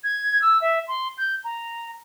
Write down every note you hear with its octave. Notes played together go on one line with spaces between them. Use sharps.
G#6
E6
E5
C6
G6
A#5